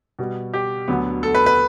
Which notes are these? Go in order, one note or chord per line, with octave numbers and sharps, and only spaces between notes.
B2 G3 B3
G4
D2 D3 F#3 B3
A4
B4
B4